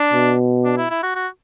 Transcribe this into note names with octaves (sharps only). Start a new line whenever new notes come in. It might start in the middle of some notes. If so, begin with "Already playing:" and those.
Already playing: D4
B2
D4
E4
E4
F#4
F#4